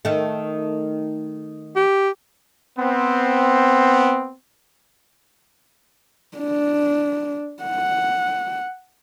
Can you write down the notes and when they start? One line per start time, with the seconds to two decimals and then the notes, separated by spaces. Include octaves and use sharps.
0.05 D#3 A3
1.76 G4
2.78 B3 C4
6.37 D4
7.63 F#5